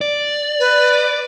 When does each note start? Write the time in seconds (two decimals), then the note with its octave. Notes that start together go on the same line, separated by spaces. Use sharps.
0.01 D5
0.60 B4